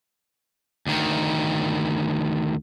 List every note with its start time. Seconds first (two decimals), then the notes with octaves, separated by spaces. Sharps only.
0.87 D2 D#3